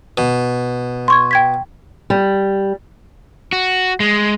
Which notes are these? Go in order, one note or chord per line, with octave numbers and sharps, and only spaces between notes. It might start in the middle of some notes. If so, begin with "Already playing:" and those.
B2
C6 C#6 G#6
G5 G#6 B6
G3
F#4
G#3